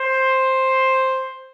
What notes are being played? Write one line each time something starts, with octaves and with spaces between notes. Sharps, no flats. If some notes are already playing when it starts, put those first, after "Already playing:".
Already playing: C5